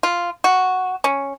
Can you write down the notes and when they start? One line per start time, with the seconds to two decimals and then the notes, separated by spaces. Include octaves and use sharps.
0.03 F4
0.44 F#4
1.04 C#4